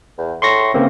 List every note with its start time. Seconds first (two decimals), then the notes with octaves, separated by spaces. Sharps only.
0.18 E2
0.42 A2 C6 C#6 A#6
0.74 C#2 C#3 A#3 C4